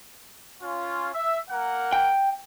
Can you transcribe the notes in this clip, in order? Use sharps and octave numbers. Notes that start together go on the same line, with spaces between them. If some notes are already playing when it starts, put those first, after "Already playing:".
C#4 F4
E5
A#3 A#4 F#5
G5